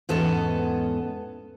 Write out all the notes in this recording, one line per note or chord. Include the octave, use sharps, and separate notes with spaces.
E2 G#2 B3 C#4 A4 D#5